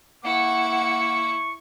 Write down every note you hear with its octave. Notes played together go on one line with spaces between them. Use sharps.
A#3 E4 F#5 C#6 C#7